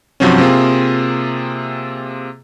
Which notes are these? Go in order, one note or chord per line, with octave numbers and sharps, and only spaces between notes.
G2 C3 F3 F#3 C4 C#4
C3 A#3 C4 F4 G#4